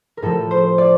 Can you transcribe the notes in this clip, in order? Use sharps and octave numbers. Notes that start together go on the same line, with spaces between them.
A#4
A2 F3 A4
C5
D5